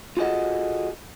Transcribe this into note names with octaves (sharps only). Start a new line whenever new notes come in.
F4 F#4 G#4 A4 D#5 F#5